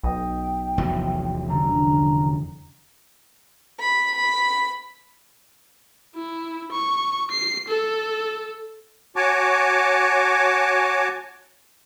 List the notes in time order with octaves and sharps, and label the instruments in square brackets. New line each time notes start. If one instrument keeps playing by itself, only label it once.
[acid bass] B1 [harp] D#5 D#6 [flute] G5
[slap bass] F1 E2 F#3 [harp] E4
[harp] D3 G3 C#4 [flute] A#5
[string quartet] B5
B5
[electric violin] E4
C#6
C7
A4
[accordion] F#4 C#5 G#5 A5 D6